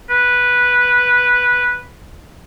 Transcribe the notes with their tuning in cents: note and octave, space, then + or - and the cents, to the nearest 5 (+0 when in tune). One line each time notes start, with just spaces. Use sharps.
B4 -5